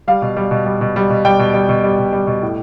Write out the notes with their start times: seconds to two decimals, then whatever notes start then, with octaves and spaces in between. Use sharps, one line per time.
0.08 G3 F5
0.22 B2
0.37 G3
0.51 B2
0.66 G3
0.81 B2
0.96 G3
1.10 B2
1.25 G3 G5
1.39 B2
1.54 G3
1.69 B2
1.84 G3
1.98 B2
2.13 G3
2.27 B2
2.42 A2